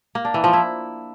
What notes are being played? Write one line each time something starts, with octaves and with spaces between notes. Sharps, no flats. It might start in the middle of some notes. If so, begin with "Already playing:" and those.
A#3
D4
E3
F3
E4